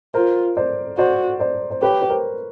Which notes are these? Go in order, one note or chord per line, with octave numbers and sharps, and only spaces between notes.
F4 A#4 C5
C5 D5
F#4 C5 D5
C5 D5
C5
G4 B4 C#5
B4
A#4 C5